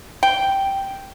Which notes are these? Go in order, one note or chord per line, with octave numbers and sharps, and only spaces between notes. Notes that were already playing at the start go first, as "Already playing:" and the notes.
G5